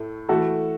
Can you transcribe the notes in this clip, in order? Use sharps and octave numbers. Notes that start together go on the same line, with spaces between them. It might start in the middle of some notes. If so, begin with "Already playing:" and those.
Already playing: A2 A3
E3 A3 F#4 A4